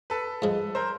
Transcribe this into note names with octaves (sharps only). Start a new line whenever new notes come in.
A4 B4
G#2 F3 G#3
A#4 C5